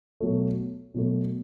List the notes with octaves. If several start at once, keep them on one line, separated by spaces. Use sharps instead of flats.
B2 F#3 A3
B2 F#3 A3